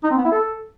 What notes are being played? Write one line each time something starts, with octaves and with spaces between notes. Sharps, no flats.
D#4
C4
B3
E4
A4